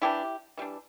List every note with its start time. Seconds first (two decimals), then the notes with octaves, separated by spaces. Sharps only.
0.02 E3 G3 D4 E4 G4
0.57 E3 G3 D4